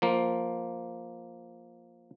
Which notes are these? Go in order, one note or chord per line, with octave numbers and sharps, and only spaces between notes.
F3 A#3